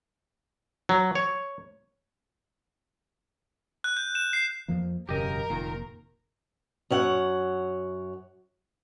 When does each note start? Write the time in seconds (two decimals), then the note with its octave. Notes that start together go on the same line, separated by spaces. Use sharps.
0.89 F#3
1.15 C#5
3.84 F#6
3.97 G6
4.15 E7
4.33 C7
4.68 F2 F3 A#3
5.09 E1 F#2 C#3 G4 A#4 D#5
5.50 F1 A#2 D#3
6.90 F#2 C#5 F#5